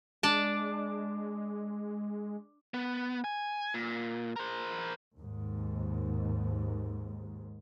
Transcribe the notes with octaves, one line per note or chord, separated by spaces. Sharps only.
G#3 D4 D5 A5
B3
G#5
A#2
A#4 C5
D#2 G#2